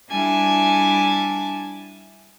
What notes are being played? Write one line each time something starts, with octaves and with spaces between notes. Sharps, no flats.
G3 D4 E4 G#5 A5 D6